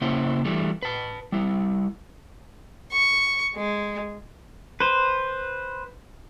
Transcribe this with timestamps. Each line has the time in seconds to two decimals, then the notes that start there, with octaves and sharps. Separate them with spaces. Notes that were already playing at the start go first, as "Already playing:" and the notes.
0.01 C#3 A#3 C#4 E4 C5
0.45 E3 G3 A3
0.83 B4 A5
1.32 G3 E4
2.91 C#6
3.55 G#3
4.80 B4 C5